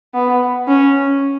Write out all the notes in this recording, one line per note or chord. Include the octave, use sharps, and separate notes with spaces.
B3
C#4